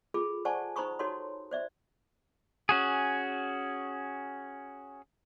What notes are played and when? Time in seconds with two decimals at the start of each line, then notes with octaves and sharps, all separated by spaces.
0.14 F4 G#4 A4 B5
0.45 C5 D5 F#5 G#5 A5 C#6
0.76 D#4 C5 A#5 B5 C#6 D#6
0.99 D#4 F#4 A4 C#5 C6
1.51 C5 D5 E5
2.69 C#4 F#4 G#4